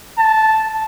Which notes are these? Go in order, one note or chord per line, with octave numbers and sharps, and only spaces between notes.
A5